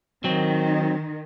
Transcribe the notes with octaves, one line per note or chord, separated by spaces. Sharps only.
D#3 F#3 C4